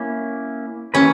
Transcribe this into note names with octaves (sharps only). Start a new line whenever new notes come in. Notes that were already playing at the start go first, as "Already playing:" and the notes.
Already playing: A#3 C#4 E4
E3 A#3 C#4 E4 G4 B4